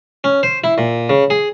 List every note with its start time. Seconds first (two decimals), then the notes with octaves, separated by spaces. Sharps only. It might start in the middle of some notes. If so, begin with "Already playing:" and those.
0.24 C#4
0.43 C5
0.64 E4
0.78 A#2
1.09 C#3
1.30 G#4